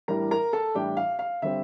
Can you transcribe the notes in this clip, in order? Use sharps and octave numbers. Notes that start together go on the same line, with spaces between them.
A2 E3 G3 D4 A#4 A#5
A#4 A#5
A4 A5
A2 E3 G3 D4 G4 G5
F5
F5
D3 G3 C4 E5